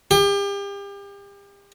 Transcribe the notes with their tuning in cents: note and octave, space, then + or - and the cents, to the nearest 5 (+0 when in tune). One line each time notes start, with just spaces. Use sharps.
G4 +35